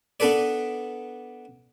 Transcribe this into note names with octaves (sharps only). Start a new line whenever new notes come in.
B3 D4 A4 B4 D5